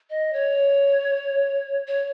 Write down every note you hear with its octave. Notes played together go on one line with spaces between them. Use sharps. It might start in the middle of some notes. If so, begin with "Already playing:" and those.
D#5
C#5
C#5